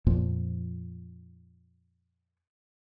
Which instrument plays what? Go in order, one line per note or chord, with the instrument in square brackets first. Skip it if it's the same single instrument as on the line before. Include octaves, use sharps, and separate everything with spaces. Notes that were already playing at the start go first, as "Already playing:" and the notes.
[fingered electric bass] F2 A#2 F3